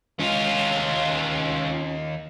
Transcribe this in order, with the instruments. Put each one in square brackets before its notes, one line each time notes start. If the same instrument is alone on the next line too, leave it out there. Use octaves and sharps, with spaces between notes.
[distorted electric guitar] D#2 F5 [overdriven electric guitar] C#4 F4